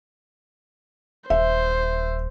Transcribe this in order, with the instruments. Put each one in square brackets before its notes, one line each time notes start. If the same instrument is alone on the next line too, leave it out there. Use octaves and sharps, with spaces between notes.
[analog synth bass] D#1 [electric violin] C5 [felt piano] E5